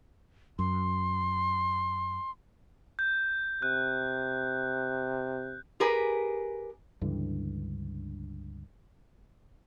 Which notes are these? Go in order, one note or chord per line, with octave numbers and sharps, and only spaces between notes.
F#2 C6
G6
C3 F#6
G4 G#4 A#4 B4 G#5
C#2 G2 D3 E3